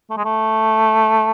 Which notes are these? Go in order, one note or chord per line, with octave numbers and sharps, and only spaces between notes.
A3
G#3
A3